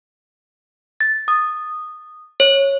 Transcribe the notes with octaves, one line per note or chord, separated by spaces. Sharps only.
A6
D#6
C#5